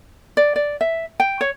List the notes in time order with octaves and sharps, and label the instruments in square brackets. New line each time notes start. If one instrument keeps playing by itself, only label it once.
[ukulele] D5
D5
E5
G5
C#5